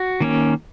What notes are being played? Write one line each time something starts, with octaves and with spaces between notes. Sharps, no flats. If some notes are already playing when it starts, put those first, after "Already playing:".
Already playing: F#4
D#3 A#3 C#4